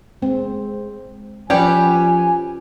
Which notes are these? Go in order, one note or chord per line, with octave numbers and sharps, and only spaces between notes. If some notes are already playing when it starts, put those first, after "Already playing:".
G#3 C4
F3 G3 C#4 G4 B4 C#5 G#5